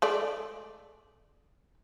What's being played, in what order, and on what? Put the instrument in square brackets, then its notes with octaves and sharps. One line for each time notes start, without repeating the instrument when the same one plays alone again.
[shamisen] G#3 A3 D5